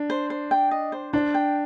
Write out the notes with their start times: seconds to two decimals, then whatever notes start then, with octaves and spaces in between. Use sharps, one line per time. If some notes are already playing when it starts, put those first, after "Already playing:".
Already playing: D4
0.10 C5
0.30 C5
0.51 G5
0.71 D#5
0.92 C5
1.13 D4 C5
1.34 G5